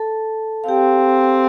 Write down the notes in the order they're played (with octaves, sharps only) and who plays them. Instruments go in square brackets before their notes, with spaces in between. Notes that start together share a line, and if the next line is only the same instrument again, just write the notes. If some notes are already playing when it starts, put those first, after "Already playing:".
Already playing: [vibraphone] A4 A5
F5
[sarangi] C4 [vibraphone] G4 G5